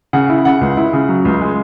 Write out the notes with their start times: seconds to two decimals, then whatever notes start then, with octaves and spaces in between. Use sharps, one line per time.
0.13 C#3 F#5
0.29 E4
0.45 C#3 F#5
0.61 C#2
0.77 E4
0.93 C#3
1.09 F#3
1.25 C#2
1.41 G#3